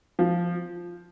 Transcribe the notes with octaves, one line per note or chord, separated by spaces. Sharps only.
F3